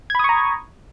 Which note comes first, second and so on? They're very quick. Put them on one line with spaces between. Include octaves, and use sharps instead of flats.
G#6 B5 D#6 C#6 A#5